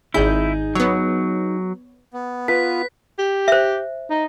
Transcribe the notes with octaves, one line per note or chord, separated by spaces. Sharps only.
G#1 D#4 E4 G#4 G6
F#3 B3 C#5
B3
F4 B4 B6
G4
C5 E5
D#4